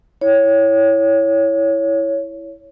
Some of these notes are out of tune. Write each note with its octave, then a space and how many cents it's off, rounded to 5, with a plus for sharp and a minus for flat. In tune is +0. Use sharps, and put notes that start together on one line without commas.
E4 +0 C#5 +5